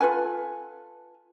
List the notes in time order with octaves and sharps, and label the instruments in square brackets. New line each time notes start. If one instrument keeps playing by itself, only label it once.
[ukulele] F4 A4 B4 G#5